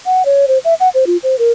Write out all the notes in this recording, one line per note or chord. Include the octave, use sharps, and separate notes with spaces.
F#5
C#5
C5
E5
F#5
C5
F4
C5
A#4